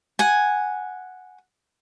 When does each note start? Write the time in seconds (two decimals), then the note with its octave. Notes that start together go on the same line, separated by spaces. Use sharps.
0.19 F#5 G#5